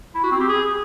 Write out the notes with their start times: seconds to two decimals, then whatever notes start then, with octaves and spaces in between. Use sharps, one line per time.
0.15 E4
0.23 F#4
0.32 C4
0.40 G4
0.49 G#4